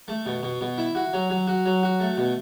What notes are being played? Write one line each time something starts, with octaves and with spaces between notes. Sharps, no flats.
A3
B2
B2
B2
E4
F#4
F#3
F#3
F#4
F#3
F#4
A3
B2